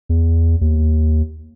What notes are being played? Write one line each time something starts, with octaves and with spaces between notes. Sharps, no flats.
E2
D#2